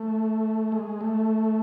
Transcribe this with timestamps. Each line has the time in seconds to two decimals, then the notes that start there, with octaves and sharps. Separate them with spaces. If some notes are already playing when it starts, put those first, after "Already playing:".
Already playing: A3
0.72 G#3
1.01 A3